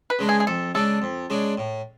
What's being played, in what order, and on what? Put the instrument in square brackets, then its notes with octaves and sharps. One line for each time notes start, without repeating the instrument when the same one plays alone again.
[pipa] B4
[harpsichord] C#3 G#3 D4
[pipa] G#4
G#4
[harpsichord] F2 [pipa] A4
[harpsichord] C#3 G#3 D4 [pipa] A4
[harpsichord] F2
C#3 G#3 D4
A2